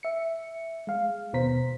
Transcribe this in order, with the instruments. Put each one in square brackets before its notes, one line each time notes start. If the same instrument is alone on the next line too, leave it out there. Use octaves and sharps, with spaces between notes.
[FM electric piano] E5 C#7
G#3 F5
D#2 B2 B3 C5 A#5 B6